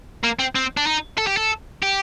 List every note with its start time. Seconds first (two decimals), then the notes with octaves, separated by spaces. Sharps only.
0.24 A#3
0.39 C4
0.55 C4
0.77 D4
0.87 D#4
1.18 A4
1.27 G4
1.37 A4
1.83 G4